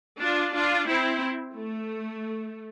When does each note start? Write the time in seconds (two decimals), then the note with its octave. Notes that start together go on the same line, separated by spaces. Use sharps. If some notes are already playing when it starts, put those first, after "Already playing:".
0.20 D4 F4
0.54 D4 F4
0.87 C4 E4
1.55 A3